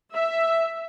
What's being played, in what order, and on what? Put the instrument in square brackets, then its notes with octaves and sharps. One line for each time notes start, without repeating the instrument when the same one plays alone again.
[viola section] E5